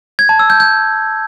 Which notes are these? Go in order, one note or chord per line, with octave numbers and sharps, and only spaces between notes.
G#6
A5
E6
G6
G6